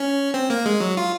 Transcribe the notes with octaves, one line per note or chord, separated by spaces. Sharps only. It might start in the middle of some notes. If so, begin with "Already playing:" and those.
Already playing: C#4
C4
A#3
G#3
F#3
F4